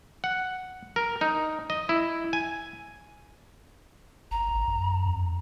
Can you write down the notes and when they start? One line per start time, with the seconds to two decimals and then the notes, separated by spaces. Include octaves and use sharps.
0.24 F#5
0.96 A#4
1.21 D#4
1.70 D#5
1.89 E4
2.33 G#5
4.31 G1 A#5
4.51 A1
4.67 F#2
5.06 F2